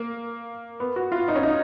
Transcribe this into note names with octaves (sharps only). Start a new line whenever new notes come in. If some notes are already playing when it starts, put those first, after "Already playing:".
Already playing: A#3
B3
F#4
F4
D#4
C#4
D#4